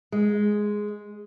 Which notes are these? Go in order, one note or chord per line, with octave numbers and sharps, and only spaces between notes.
G#3